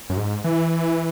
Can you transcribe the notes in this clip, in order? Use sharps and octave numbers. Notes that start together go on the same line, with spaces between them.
F#2
G#2
E3